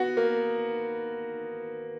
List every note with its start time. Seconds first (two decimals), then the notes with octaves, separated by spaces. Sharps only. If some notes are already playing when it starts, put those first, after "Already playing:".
Already playing: B3 F#4
0.17 A#3